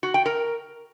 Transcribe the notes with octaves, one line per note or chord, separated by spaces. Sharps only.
F#4
G5
A#4